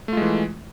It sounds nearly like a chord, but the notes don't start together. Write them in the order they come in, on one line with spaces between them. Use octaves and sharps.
A3 F4 G#3 E3